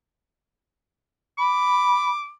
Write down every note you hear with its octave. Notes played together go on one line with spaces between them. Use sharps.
B5 D6